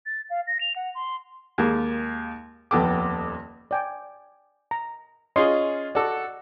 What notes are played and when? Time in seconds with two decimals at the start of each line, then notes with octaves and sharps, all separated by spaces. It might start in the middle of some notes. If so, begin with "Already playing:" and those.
0.06 A6
0.30 F5
0.47 A#6
0.61 F7
0.76 F#5
0.95 C6
1.58 D#2 G#3 A#3
2.71 D#1 F2 B3 A4 G5 D6
3.71 D5 G5 G#5
4.71 A#5
5.36 C#4 F4 G#4 D#5 C6
5.95 F#4 A4 D5